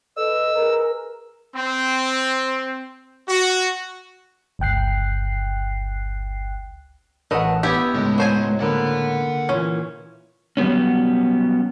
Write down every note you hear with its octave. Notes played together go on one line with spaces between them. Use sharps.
A4 B4 D#5 E6
G#4 A#4 B4 A#5
C4
F#4
G1 C#2 G5 F#6 C7
A1 A3 A#4 B4 D#5 F5 F#5
B3 E4 G4
C#2 A2 G#3
F#3 C5 G#5
D3 A#3 F#5 B5
A#2 E3 C#4
F#3 G3 B3 C#4